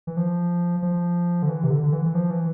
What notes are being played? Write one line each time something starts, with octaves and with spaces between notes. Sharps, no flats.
E3
F3
F3
D3
E3
C3
D3
D3
E3
E3
F3
E3